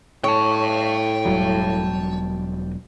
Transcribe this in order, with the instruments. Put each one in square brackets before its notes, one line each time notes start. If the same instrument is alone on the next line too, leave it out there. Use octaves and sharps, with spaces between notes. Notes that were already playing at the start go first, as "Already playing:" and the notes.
[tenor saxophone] A2 [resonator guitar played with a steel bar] C#5 [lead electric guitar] G5 A5
[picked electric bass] E1 F#3 G3